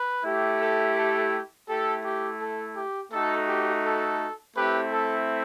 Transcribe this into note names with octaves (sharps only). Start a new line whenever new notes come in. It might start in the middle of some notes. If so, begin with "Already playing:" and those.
Already playing: B4
A3 E4 G4
A4
A4
A3 E4 G4 A4
G4
A4
G4
A3 D#4 F#4 A4
G4
A4
A3 C4 E4 G4 B4
A4